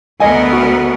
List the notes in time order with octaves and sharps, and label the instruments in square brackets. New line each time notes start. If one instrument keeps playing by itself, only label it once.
[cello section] D2 B3 A#4 [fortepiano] D#5 G#5
[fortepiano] F#4